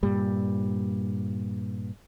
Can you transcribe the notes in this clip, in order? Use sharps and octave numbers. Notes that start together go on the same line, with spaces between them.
G2 A#2 G3